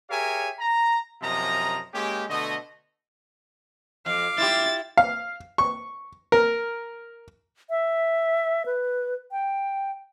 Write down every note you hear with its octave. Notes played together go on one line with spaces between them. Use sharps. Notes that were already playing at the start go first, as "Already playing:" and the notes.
G4 G#4 A#4 C#5 E5 G#5
A#5
F#2 C3 F3 D#5 A#5
G#3 A#3 C#4 G4
B2 D3 A3 D#5
F2 F5 D6
E4 F4 G4 E5 A6
F5
C#6
A#4
E5
B4
G5